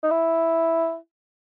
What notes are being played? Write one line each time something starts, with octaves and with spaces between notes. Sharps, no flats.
D#4
E4